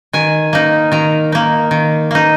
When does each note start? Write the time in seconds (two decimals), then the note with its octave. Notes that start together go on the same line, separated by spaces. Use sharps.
0.13 D#3 G#5
0.53 A#3 D#4
0.92 D#3 A#5
1.32 A#3 D#4
1.71 D#3
2.11 A#3 D#4